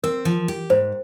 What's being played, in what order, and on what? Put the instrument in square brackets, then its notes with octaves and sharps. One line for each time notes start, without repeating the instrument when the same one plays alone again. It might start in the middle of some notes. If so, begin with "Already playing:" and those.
[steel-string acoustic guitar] C4 [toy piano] A#4
[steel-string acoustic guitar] F3
G4
[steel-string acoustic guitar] G#2 [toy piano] C5